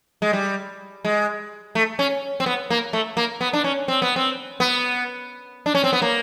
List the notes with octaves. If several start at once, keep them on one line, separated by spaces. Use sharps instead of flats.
G#3
G3
G#3
A3
C#4
C4
B3
A#3
A3
A#3
B3
D4
C#4
C4
B3
C4
B3
D4
C#4
C4
B3
A#3